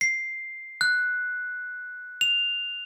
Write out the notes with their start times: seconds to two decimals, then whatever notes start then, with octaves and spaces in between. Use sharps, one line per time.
0.01 C7
0.81 F#6
2.21 F7